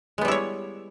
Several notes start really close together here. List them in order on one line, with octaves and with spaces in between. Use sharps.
G#3 B3 G3 E4 C#5